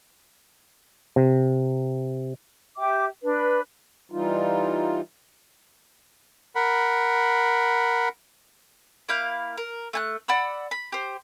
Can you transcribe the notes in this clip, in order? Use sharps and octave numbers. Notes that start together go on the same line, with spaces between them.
C3
G4 E5 G5 D6
D4 B4
E3 G3 D#4 F4
A#4 F#5 B5
A#3 E4 F5 G6
A#4
A3 G#5 F#6
D5 F#5 B5 E6
B5
G4 C5